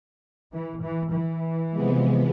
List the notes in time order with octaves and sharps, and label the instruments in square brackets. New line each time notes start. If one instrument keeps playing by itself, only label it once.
[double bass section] E3
E3
E3
[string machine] C3 F3 G#3 B3